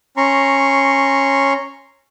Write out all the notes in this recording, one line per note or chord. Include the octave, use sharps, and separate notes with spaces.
C#4 A#5 C6 C#6